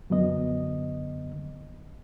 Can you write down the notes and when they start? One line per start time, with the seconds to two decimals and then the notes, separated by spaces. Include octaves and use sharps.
0.10 F#2 D3 F#3 B3 D#5